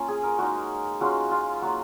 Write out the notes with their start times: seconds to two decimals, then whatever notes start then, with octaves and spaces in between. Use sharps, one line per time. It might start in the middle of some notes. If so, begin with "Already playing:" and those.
Already playing: A#3 C#4 F4
0.08 G#4
0.23 A#4
0.39 G#3 D#4 F#4
1.01 G#3 C#4 F4 F#4
1.31 F4
1.62 F#3 A#3 F4 F#4